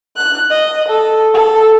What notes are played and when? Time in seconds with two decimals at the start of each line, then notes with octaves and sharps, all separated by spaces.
0.16 F#6
0.51 D#5
0.88 A4
1.34 A4